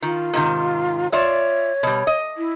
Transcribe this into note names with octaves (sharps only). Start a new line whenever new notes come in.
D#3 F4
G#2 C3 D#3
F4 C#5 D5 E5
B2 G3
D#5
E4